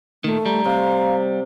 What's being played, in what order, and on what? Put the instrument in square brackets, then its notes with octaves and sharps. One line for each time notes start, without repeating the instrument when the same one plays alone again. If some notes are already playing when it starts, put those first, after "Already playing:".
[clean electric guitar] A#2 D#3 [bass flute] A3
[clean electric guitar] G3 [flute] A#5
[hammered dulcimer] C3 [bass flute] F5